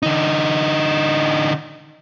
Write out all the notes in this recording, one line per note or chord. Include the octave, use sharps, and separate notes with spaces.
D3 D#4